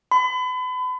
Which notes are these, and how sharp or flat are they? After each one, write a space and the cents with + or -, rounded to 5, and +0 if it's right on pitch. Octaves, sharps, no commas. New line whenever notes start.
B5 +35